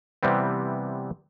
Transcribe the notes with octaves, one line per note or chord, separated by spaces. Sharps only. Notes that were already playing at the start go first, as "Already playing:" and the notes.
C3 E3 G3 B3 C4